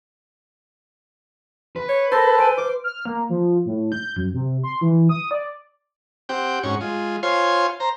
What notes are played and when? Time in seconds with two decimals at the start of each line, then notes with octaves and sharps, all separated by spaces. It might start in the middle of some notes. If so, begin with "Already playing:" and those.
1.76 B4
1.89 C#5
2.12 A4 A#4 C5 A5 B5 A#6
2.38 C5 G#5 D7 D#7
2.58 B4 D6
2.84 F6
3.06 A#3
3.29 F3
3.66 A2
3.92 G6
4.16 F#2
4.34 C3
4.64 C6
4.81 E3
5.09 D#6
5.31 D5
6.29 C4 G4 F#5 G5
6.63 G#2 C#4 F#4 C#6
6.81 G#3 F4
7.23 F4 C5 C#5 F5 G#5 C6
7.80 C5 A#5